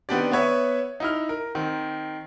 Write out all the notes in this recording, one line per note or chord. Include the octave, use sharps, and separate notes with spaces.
D#3 B3 C4 D4 G4 D5
B3 B4 C#5 E5
D#4 E4 F6
A#4
D#3 C4